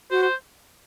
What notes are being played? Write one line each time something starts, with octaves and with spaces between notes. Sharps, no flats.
F#4 C5
C5